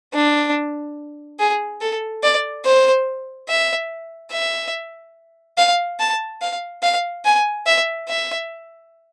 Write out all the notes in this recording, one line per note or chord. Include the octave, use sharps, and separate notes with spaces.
D4
G#4
A4
D5
C5
E5
E5
F5
A5
F5
F5
G#5
E5
E5